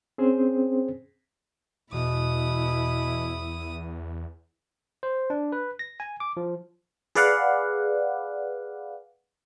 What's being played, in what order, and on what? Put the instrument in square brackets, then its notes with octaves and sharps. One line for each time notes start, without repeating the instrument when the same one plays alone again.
[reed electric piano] C4 C#4 G#4 C5
[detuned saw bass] E2 [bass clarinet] B2 [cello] E4 [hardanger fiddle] D#6
[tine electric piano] C5
D4
B4
A#6
G#5
D6
F3
[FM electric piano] G#4 B4 D5 F5 F#5